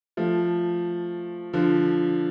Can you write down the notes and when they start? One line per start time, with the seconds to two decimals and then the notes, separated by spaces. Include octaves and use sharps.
0.17 F3 A3
1.53 D3 F3